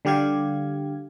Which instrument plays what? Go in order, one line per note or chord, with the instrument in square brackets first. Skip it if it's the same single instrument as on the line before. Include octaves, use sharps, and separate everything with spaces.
[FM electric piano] D3 G3 G4 F5 G#6